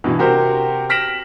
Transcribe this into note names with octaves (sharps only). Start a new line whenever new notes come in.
G2 B2 E3
C3 F#4 G4 A#4 C5
F6 A#6 B6 D7 E7 F#7